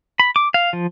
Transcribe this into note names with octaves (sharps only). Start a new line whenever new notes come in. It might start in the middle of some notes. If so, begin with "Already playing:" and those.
B5
D6
F5
F3